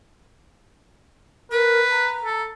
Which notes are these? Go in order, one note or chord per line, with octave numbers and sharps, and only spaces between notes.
A#4 B4
A#5
A4